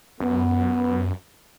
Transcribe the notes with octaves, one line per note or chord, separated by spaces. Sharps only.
F#2 B3